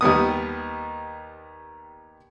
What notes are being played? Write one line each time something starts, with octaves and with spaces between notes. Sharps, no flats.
D#2 G3 B3 D#6